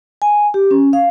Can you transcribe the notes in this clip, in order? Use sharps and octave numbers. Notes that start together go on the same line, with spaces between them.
G#5
G4
C#4
F5